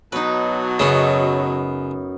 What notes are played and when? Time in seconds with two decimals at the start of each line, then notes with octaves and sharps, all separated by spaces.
0.12 B2 F#3 D#4 B4
0.79 F#2 C#3 B3 D#4